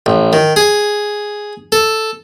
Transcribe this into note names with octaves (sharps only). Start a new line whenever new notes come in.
A1
D#3
G#4
A4